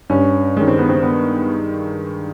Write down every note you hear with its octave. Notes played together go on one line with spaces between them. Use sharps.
G2 C#4
D#3 G#3 C#4
C4
B3
C4
B3